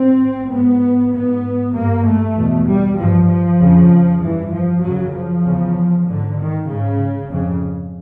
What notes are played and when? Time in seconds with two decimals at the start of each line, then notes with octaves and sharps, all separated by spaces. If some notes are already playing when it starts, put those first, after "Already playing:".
Already playing: C4
0.50 G#2 B3
1.12 G#2 B3
1.74 G2 A#3
2.05 A3
2.36 E2 B2
2.67 G3
2.98 G2 F3
3.29 F3
3.60 F2 C#3
4.21 G2 E3
4.52 F3
4.83 F#2 C#3 F#3
5.14 F3
5.45 E2 C#3
6.07 G#2 D3
6.38 D#3
6.68 G#2 C#3
7.30 F2 C#3